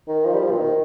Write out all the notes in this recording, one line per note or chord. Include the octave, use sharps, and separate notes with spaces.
D#3
F3
G3
F3
A#2
D#3